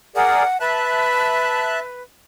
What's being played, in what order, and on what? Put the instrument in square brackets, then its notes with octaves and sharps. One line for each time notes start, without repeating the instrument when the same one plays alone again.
[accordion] G#4 A#4 D5 [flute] F#5
[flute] B4 [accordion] E5 A5 F#6